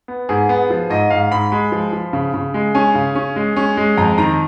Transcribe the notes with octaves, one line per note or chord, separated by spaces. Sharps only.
B3
G#2 G#4
B3
F3
G#2 D#5
G#2 F5
G#2 B5
G#3 B5
F3
F3
C#3
C#3
G#3
C#4 G#5
C#3
C#4
G#3
C#4
G#3
F2 A#5
D#3 A#5